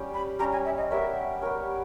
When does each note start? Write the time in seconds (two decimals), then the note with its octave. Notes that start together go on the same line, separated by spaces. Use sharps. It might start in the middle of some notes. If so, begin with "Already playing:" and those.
Already playing: G3 C#4 G4
0.14 B5
0.39 G3 C#4 G4 A#5
0.52 G#5
0.65 E5
0.77 D#5
0.90 B3 G4 A#4 C#5 E5
1.42 B3 G4 A#4 C#5